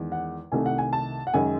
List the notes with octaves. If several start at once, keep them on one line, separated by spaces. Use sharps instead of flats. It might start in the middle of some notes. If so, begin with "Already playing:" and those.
Already playing: E2 D#3 G#3
F#5
C2 C3 D#3 A3 G#5
F#5
G#5
A5
F#5
F#2 D#3 G#3 G#5